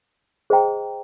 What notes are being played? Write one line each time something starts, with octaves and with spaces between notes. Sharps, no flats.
G#4 C5 D#5 G5 A#5